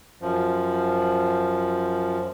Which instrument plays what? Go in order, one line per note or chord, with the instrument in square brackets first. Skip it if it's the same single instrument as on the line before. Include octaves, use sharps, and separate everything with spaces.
[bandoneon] F#2 F3